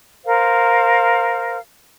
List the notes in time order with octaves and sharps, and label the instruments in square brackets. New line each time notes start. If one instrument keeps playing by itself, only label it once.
[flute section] A#4 C5 F5